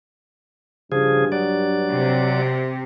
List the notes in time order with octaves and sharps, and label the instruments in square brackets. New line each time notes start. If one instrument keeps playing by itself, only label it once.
[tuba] G2 [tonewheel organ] C#3 F3 G#4
[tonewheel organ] F#3 D5
[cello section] C3